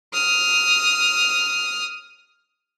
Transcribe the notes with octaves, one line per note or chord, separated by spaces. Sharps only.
D#6 F6